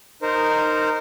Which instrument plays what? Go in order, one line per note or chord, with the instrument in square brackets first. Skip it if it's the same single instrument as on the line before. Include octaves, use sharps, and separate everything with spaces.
[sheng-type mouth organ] D#4 A#4 C5